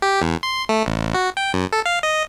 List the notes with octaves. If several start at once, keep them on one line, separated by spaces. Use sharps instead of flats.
G4
E2
C6
A3
A1
F#4
G5
F#2
A4
F5
D#5